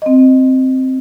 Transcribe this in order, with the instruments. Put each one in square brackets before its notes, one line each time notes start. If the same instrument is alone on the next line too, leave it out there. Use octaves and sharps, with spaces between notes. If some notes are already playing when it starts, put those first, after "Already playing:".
[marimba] C4 D#5